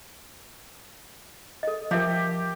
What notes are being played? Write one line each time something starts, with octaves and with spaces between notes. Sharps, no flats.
A4 D#5
F3 G4 A#4 E5 G5